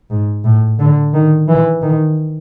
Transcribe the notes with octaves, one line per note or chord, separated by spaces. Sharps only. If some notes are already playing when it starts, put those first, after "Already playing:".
G#2
A2
D3
D#3
E3
D#3